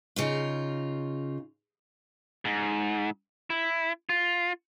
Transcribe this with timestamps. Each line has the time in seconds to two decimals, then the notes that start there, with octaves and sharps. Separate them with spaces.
0.16 C#3 D#4 F4
2.45 G#2
3.50 E4
4.09 F4